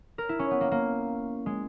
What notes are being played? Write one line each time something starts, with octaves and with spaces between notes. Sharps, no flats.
A#4
E4
C#4
B3
A#3
A#3
G#3